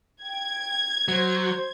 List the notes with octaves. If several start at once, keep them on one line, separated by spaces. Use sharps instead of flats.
G5 G#6
F#3 F#4 C5